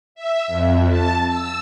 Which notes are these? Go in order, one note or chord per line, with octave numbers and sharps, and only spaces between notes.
E5
F2
A5
E6